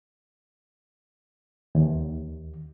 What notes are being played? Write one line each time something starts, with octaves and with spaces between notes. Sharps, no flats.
D#2